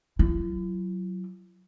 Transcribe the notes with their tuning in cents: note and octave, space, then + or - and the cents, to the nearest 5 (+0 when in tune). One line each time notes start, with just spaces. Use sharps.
F#3 +5 E4 +45